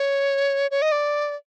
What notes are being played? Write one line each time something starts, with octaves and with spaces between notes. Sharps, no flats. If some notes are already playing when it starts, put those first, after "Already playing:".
Already playing: C#5
C#5
D#5
D5